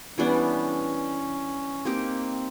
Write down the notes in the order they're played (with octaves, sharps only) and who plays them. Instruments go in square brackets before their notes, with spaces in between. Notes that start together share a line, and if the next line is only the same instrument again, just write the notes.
[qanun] E3 G3 B3 D4 [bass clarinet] C#4
[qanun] A#3 D#4 G4 [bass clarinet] C4